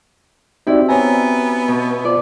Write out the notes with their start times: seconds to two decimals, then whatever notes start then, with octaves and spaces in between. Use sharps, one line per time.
0.67 C4 D#4 E4 F#4 G4 D5
0.89 B3 C#5 G#5 A#5
1.68 B2
2.05 F4 C5 D5